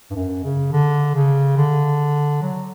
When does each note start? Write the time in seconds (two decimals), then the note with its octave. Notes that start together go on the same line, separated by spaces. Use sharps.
0.11 G2
0.15 F#2
0.44 C#3
0.72 D3
1.15 C#3
1.57 D3
2.42 F#3